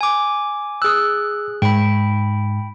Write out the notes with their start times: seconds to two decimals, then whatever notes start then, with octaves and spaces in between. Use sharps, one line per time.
0.01 G#5 D6
0.82 G#4 D#6 E6 F#6
1.62 G#2 G5 B5